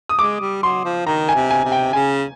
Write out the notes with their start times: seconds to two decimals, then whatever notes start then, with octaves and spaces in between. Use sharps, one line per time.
0.09 D#6
0.19 G#3 D6
0.40 G3
0.63 F#3 C6
0.85 F3
1.06 D#3 A#5
1.29 G#5
1.35 C3
1.51 G#5
1.65 C3
1.72 G5
1.93 C#3 G#5